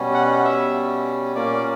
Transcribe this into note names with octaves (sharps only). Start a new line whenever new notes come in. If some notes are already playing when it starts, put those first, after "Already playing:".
Already playing: B2 G3 C#4
F#5
E5
A#2 A#3 C#4 D5